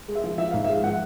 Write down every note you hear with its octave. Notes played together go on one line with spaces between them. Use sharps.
G#3
E5
F3
F3 E5
G#2 F5
E5
G#3
F3 F#5